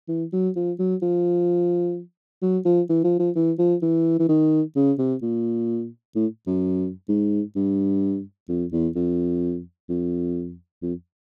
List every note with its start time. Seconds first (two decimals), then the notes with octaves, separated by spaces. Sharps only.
0.08 E3
0.33 F#3
0.56 F3
0.79 F#3
1.02 F3
2.42 F#3
2.65 F3
2.90 E3
3.04 F3
3.20 F3
3.36 E3
3.59 F3
3.82 E3
4.19 E3
4.29 D#3
4.76 C#3
4.99 C3
5.22 A#2
6.15 A2
6.47 F#2
7.09 G#2
7.56 G2
8.49 F2
8.72 E2
8.96 F2
9.90 F2
10.82 F2